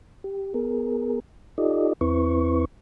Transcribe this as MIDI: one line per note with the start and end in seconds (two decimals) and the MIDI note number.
0.24 0.53 67
0.54 1.20 59
0.54 1.20 68
0.54 1.20 70
1.58 1.93 63
1.58 1.93 65
1.58 1.93 67
1.58 1.93 69
1.58 1.93 74
1.58 1.93 75
2.01 2.65 40
2.01 2.65 60
2.01 2.65 64
2.01 2.65 71
2.01 2.65 85